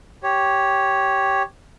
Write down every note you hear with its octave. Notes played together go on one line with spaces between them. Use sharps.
G4 C#5